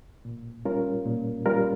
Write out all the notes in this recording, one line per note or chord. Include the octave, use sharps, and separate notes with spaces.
A#2
G3 C#4 F4 A#4
A#2
G3 C#4 F4 A#4